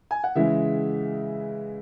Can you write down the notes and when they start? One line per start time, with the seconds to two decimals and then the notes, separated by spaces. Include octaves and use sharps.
0.11 G#5
0.24 F#5
0.35 C#3 E3 G#3 E5